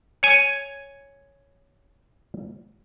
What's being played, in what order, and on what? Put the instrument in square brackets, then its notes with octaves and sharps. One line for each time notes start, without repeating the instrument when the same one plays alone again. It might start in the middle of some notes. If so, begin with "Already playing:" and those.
[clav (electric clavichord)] C#5 G#5